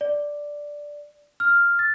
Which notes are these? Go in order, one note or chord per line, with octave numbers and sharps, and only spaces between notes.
D5
F6
A6